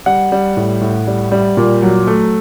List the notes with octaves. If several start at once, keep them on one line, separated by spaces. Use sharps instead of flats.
G3 F#5
G3
A2
A2
G3
G3
A#2
F#3
A3